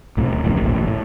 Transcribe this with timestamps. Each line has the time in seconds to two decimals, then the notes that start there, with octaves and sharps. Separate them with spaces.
0.17 B1 A2 C3
0.32 D1
0.44 D1 F2 A2 C#3
0.60 A1 D2 A#2
0.76 A1
0.88 A2